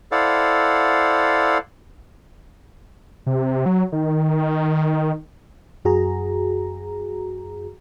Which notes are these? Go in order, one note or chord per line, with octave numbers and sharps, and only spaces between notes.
E4 A4 C5 D5 F5 F#5
C3
F#3
D#3
F#2 F#4 G#4 A#5